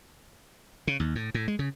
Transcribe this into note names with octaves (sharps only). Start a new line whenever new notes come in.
C#3
D#2
A2
A2
G#3
C#3